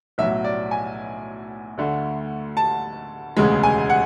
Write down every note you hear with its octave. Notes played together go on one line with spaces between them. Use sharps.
B1 A2 F#3 E5
D5
G#5
D2 D3 A3
A5
E1 D2 C#3 G#3
G#5
F#5